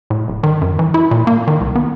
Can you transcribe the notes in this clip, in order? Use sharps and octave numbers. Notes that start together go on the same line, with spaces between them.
A2
D1
D#3
F#2
E3
E4
A#2
A#3
D#3
C2
B3